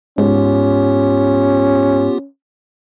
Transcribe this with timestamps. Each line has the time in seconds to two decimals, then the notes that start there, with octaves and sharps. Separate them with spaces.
0.18 G#2 B3 C#4 F4 G4